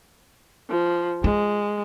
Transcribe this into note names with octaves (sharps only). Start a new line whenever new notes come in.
F3
G#3 F4